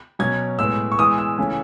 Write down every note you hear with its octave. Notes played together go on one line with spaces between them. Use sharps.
B2 F#3 C#4 G#6
A2 G#3 B3 E6
C#6
E3 G#3 B3 D#6
E6
C#3 E3 A3 C#4